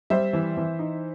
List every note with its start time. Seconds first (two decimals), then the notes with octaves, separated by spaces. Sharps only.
0.10 G3 C5 E5
0.33 E3
0.57 E3
0.79 D#4